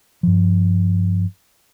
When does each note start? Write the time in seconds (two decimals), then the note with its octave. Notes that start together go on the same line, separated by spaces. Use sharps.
0.23 G2 F3